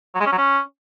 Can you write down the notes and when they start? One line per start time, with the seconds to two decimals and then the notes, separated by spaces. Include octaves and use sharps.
0.15 F#3
0.21 G#3
0.26 C#4
0.32 F#3
0.38 C#4